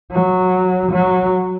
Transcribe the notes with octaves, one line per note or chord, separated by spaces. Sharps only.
F#3
F#3